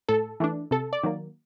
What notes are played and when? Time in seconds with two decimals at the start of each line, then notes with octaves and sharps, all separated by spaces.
0.08 A2 A4
0.40 E3 A3 D4
0.71 C3 A4
0.93 D5
1.03 D#3 F#3 A#3